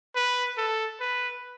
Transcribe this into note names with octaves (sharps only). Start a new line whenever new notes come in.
B4
A4
B4